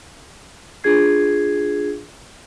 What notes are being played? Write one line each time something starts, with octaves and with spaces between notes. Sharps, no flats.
D4 F4 G#4 G#6 C7